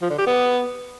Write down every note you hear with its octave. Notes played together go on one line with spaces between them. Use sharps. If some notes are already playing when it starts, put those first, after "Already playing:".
F3
D3
G4
B3